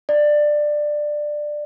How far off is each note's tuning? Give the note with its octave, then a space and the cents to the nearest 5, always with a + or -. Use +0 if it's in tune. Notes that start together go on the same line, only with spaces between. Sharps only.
D5 +15